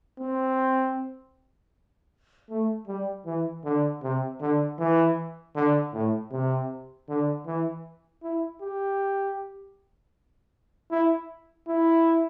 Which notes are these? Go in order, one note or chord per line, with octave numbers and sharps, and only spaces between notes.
C4
A3
G3
E3
D3
C3
D3
E3
D3
A2
C3
D3
E3
E4
G4
E4
E4